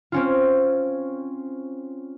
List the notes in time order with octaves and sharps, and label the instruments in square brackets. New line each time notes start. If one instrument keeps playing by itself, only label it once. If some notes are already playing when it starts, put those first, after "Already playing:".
[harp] C4 C#4 F4